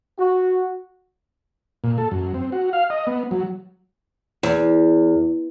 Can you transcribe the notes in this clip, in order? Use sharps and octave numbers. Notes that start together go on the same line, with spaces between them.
F#4
A#2
A4
F#2
C4
F#4
F5
D#5
B3
F#3
E2